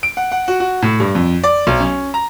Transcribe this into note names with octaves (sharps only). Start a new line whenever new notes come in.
D7
F#5
F#5
F#4
F#4
A2
G2
F2
D5
B1
C#4
A#5